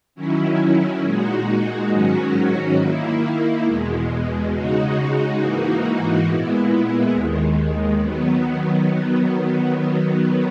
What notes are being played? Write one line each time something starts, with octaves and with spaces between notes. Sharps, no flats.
D#3 F#3 C#4 E4
A#2 G#3 D#4 F#4
G#2 D#3 F#3 C#4 F#4
D#3 A#3 E4
E2 B2 G#3
C#3 G#3 D#4 F#4
G#2 E3 A#3 D#4 F#4
A#2 G#3 B3 E4
D#2 D#3 G#3
D#3 F#3 B3